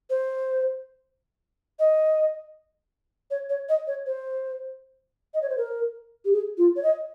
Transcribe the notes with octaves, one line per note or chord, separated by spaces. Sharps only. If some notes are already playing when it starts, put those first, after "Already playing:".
C5
D#5
C#5
C#5
D#5
C#5
C5
D#5
C#5
C5
A#4
G4
G#4
F4
C#5
D#5